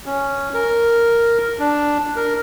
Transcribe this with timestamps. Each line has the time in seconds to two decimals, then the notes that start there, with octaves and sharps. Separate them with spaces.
0.06 C#4
0.54 A#4
1.59 D4
2.16 A#4